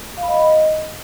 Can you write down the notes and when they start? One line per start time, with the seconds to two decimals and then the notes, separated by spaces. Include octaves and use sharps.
0.18 F5
0.23 B5
0.28 D#5